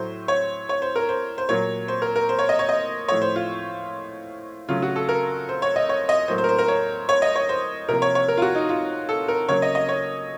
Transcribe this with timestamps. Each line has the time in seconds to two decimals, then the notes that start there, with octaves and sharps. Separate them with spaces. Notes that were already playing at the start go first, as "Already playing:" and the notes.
Already playing: A2 F#3 A3 C5
0.28 C#5
0.69 C#5
0.82 C5
0.96 A#4
1.09 C5
1.38 C5
1.49 A#2 F#3 A#3 C#5
1.88 C5
2.02 A#4
2.16 A#4
2.29 C5
2.39 C#5
2.49 D#5
2.59 C#5
2.69 D#5
3.08 A2 F3 A3 C#5
3.22 C5
3.36 F4
4.69 C#3 F#3 A3 F4
4.82 F#4
4.96 A4
5.09 A#4
5.49 C5
5.62 C#5
5.76 D#5
5.89 C#5
6.09 D#5
6.28 A2 F#3 A#3 C5
6.38 C5
6.44 A#4
6.49 C5
6.58 A#4
6.68 C#5
7.09 C#5
7.22 D#5
7.36 C#5
7.49 C5
7.88 C3 F3 A#3 A#4
8.02 C#5
8.15 C#5
8.28 A#4
8.37 F4
8.42 F#4
8.55 D#4
8.69 F4
9.09 A4
9.28 A#4
9.48 C#3 F#3 A#3 C#5
9.62 D#5
9.75 D#5
9.89 C#5